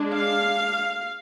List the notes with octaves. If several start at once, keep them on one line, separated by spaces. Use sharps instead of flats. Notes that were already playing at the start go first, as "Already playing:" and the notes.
Already playing: G#3 D4
F5